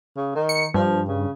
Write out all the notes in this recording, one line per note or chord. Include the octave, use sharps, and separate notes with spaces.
C#3
D#3
C#7
G2 F3
C#3